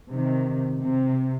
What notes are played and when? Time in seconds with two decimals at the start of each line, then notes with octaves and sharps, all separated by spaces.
0.12 C3 D#3
0.80 C3